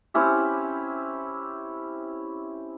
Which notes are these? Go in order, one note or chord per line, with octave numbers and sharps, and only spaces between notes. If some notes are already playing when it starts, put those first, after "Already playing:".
C4 C#4 E4 G4